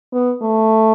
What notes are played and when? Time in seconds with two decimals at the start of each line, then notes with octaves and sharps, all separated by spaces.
0.13 B3
0.42 A3